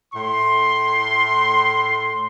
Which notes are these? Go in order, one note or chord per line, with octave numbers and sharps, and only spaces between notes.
A2 C6